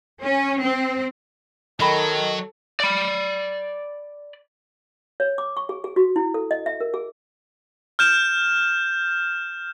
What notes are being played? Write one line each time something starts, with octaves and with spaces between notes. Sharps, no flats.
C#4
C4
D#3 F#3 A4 D#5 B5
D5 B5
C#5
D6
C#6
G#4
G#4
F#4
E4
A4
D#5
E5
A#4
G#4
F6 G6 E7